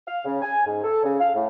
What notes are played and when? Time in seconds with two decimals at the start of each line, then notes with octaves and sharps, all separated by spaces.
0.07 F5
0.25 C#3
0.42 G#5
0.66 G#2
0.84 A4
1.04 C#3
1.20 F5
1.35 A2